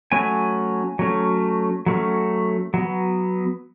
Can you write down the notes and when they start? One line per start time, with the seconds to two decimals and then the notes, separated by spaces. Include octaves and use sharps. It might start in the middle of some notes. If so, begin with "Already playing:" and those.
0.12 F#3 A3 C#4 G#5
0.99 F#3 A3 C#4
1.86 F#3 A3 C#4
2.74 F#3 B3